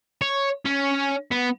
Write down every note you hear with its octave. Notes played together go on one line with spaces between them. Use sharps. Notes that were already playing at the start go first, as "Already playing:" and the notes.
C#5
C#4
B3